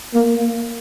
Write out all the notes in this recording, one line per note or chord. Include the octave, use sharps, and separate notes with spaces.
A#3